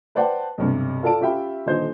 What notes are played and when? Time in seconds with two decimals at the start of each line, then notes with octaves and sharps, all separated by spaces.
0.15 B4 C5 D5 F#5 G5 A5
0.58 B1 G2 C3
1.03 F4 A4 D5 A5 D7
1.20 C#4 F4 G4 E5 G5 B5
1.66 D#1 D3 D#4 C5 G6